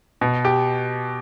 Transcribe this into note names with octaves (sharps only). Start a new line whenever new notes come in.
B2
G4